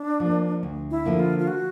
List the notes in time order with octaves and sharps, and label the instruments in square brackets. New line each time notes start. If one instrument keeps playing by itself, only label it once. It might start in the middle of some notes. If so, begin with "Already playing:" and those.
Already playing: [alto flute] D4
[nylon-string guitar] F3 A#3
D2
[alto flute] E4
[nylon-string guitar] D3 F3 A#3
[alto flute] F4
F4
F#4